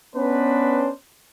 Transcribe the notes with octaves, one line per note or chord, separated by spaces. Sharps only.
B3 C#4 D4 B4 C5